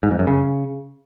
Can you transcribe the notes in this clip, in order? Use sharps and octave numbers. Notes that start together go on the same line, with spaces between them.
G#2
F2
F#2
C#3